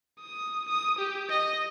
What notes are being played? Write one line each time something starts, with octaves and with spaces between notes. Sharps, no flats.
D#6
D#6
G4
D#5